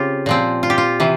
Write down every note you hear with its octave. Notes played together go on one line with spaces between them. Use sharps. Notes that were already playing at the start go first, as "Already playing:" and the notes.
Already playing: C#3 C4 F4 G4
A#2 F3 C4
F4
G4
F4
C3 E3